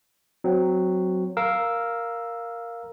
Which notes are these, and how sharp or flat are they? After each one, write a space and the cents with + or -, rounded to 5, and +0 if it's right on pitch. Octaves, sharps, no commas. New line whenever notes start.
F#3 +0 C4 -10
A#4 +0 F5 +0 E6 +0